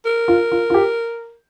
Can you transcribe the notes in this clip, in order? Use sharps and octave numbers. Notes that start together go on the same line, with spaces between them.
A#4
F4
F4
F4
G4